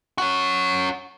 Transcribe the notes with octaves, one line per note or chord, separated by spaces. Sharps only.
C#4 F#4